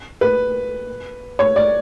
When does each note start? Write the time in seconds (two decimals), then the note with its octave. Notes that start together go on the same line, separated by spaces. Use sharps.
0.21 B4
1.39 C#5
1.56 D5